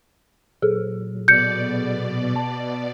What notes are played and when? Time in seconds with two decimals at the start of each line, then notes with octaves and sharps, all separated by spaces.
0.62 A#2 F#3 G#4 A4
1.28 B2 D5 G6 C#7
2.36 A5